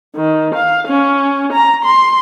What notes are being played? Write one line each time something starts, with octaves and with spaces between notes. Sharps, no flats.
D#3
F5
C#4
A#5
C6